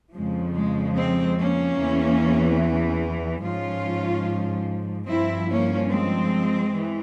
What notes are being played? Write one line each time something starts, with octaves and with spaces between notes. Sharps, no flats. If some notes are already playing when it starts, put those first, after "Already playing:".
F2 C#3 F3 G#3
G#3
G#3 C4
A#3 C#4
E2 E3
G#2 F3 C#4 F4
G2 F3 C4 E4
A#3 C#4
G#3 C4
E3